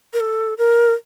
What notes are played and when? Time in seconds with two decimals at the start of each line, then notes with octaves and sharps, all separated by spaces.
0.13 A#4
0.20 A4
0.58 A#4